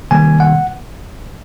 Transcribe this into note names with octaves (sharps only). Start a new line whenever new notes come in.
C3 D#3 G3 A#3 G#5
F#5